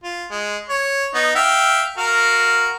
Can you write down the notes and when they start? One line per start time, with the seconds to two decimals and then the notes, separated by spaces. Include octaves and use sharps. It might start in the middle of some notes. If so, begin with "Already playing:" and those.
0.04 F4
0.31 G#3
0.69 C#5
1.14 B3 D#4
1.35 E5 F5 G5
1.98 F#4 A#4 F5